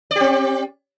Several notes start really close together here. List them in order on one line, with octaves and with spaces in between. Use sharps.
D5 G4 C4